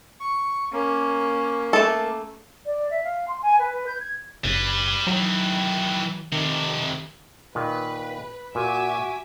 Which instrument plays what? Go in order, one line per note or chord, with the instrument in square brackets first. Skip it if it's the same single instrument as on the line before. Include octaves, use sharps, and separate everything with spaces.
[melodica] C#6
[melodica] A#3 [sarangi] C#4
[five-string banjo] A3 A4
[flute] D5
E5
F5
C6
G#5
B4
G6
G#6
[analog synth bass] F#1 [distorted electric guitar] G3 B4
[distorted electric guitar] D#3 E3 [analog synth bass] F#3
[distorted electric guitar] F2 C3 [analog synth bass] D#3
[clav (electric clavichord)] A#2 D#3 [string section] B4
[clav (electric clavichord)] A#2 [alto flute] F#4 [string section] E5 D6 [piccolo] G#5